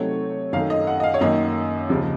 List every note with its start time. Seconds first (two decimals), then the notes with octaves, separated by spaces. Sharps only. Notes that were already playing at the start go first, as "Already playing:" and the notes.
Already playing: C3 F#3 A3 C4 D#4 C#5
0.53 F#2 D#3 A3 F5
0.70 D#5
0.87 F#5
1.00 D#5
1.03 F5
1.14 C#5
1.21 F#2 D#3 A#3 D#5
1.89 D#2 C#3 F3